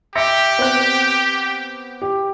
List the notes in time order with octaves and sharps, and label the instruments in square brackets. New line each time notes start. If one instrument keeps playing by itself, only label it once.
[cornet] G4 [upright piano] E5 A#6 C#7
[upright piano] B3 C4 F#6
G4